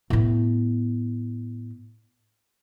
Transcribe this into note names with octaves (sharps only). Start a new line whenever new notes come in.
A2 B3